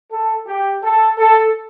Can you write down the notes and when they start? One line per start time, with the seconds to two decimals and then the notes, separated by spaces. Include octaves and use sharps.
0.12 A4
0.47 G4
0.83 A4
1.18 A4